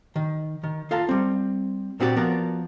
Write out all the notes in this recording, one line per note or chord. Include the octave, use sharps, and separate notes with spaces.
D#3
D#3
F4 A4 F5 A#5
G3 C4
A#2 C4 F#4 G4 A#4 D5
F3 B3 F#4 A#4 D5